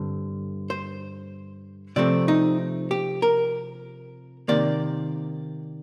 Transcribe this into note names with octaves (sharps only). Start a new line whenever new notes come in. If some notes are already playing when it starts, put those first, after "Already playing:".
Already playing: G2 D3 C4
C5
C3 F3 A3 C4 D5
D#4
G4
A#4
C3 D#3 A#3 D5